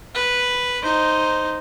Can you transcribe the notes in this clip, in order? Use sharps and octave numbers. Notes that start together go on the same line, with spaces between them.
B4
D#4 C5